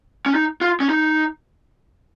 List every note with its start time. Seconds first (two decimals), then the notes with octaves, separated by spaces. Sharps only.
0.26 C#4
0.35 D#4
0.61 F4
0.80 C#4
0.89 D#4